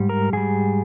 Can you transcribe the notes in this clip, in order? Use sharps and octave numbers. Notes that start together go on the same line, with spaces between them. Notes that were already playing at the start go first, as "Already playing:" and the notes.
Already playing: G#2 G3
A#4
G#2 G3 G#4